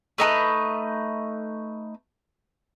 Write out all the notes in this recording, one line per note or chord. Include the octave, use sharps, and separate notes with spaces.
A3 D#4 A4 B4